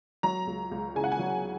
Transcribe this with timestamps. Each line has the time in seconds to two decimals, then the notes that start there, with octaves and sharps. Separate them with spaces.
0.23 F#3 A#5
0.47 C#2
0.72 C#2
0.95 C#3 G#5
1.04 F#5
1.12 G#5
1.19 F#3